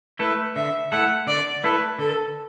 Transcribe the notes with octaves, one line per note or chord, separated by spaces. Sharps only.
A3 E4 A4 B4
D3 E5
A3 E4 A4 F#5
D3 D5
A3 E4 A4 B4
D3 A4